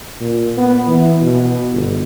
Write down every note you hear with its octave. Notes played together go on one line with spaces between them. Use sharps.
A#2
B3
E3
B2
G1